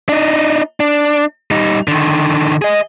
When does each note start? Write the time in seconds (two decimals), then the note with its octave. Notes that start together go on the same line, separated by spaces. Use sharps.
0.09 D4 D#4
0.80 D4
1.51 G3 D#4
1.88 D3 D#3
2.62 G#4 D#5